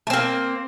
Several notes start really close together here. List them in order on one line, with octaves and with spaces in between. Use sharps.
A3 C4 A#3